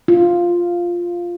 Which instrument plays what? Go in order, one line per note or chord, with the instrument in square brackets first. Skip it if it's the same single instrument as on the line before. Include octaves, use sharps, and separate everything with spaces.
[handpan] F4